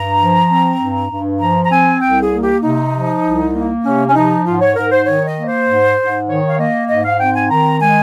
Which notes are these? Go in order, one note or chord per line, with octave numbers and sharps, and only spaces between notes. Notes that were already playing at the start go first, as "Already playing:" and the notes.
Already playing: G2 A#5
F3
C4
G2
G2
F3 A#5
A#5
C4 G#5
C2 G5
G#4
A#3
G4
C3 D#4
F3
C2
A#3
C3 C#4
C#4
F3 D#4
G#2 F4
C#5
G#2 A#4
C5
D#3 C#5
D#5
A#3
C5
G#2
G#2
D#3 C#5
F5
A#3 D#5
G#2 D#5
F5
C4 G5
G#5
D#3 A#5
G#3 G#5